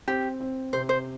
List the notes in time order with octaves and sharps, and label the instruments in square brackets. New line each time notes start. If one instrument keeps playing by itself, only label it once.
[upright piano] C4 [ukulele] G4
[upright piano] C4
[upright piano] C3 [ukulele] C5
[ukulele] C5